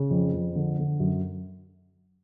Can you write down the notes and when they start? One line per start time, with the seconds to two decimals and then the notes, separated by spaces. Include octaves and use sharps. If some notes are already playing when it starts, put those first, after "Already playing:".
Already playing: C#3
0.10 F2
0.33 F2
0.55 D3
0.78 D3
1.00 F#2